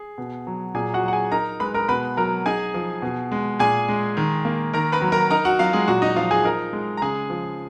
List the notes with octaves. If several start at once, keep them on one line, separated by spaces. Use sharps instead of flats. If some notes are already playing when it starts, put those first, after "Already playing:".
Already playing: G#4
B2
F#3
A#2 G#4 G#5
F#4 F#5
F#3
F#5
G#4 G#5
D#4 A#4 A#5
G#3 B4 B5
A#4 A#5
B2 B4 B5
F#3 A#4 A#5
D#4 G#4 G#5
F3
B2
G#3
A#2 G#4 G#5
G#3
D#3
A#3
D#3 A#4 A#5
B4 B5
F#3
A#4 A#5
D#4 A#4 A#5
F#4 F#5
F#3 F4 F5
G#3 G#4
A#2 F#4
D#4 D#5
F3 F4 F5
G#4 G#5
D#4 A#4 A#5
G#3
A#5
C#3 G#4 G#5
F3